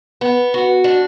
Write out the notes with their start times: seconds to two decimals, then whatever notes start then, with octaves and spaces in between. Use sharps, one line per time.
0.21 B3
0.54 F#4
0.84 D4